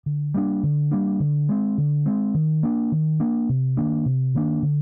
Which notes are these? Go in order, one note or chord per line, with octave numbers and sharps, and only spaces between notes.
D3
G3 A#3 D4
D3
G3 A#3 D4
D3
G#3 C4
D3
G#3 C4
D#3
A#3 D4
D#3
A#3 D4
C3
D#3 A#3 D4
C3
D#3 A#3 D4
D3